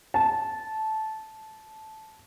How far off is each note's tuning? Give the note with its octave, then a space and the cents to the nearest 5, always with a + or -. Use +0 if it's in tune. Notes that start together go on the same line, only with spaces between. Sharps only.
A5 -15